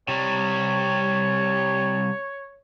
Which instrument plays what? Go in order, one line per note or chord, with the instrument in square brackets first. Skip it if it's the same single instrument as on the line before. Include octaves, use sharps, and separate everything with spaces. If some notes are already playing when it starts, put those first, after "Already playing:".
[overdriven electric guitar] C3 G3 [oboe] C#5